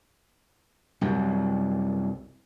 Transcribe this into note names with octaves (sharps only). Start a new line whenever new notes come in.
C2 F#2